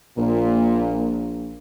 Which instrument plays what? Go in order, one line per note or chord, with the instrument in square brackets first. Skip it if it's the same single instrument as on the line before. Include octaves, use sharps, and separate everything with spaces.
[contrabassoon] A#1 [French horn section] A#2